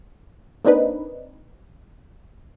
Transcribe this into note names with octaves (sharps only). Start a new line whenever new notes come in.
A#3 C4 D4 D#4 B4